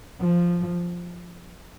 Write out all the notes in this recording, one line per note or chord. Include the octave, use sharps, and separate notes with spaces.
F3